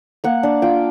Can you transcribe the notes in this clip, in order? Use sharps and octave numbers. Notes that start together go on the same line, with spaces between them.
A#3 F#5
D4
F4 G5